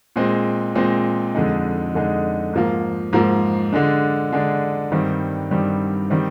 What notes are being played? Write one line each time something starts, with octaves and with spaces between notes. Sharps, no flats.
A#2 G#3 C4
A#2 G#3 C4
F2 D3 G#3 D#4
F2 D3 G#3 D#4
G#2 F3 A#3
G#2 F3 A#3
D3 G#3 D4
D3 G#3 D4
G2 D#3 G3 C4
G2 D#3 G3 C4
D#3 G3 C4